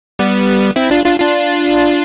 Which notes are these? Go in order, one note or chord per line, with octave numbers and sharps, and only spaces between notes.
G3 B3
C4 E4
D4 F4
D4 F4
D4 F4